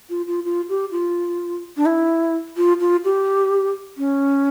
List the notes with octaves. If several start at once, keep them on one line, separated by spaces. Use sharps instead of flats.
F4
F4
F4
G4
F4
D4
E4
F4
F4
G4
C#4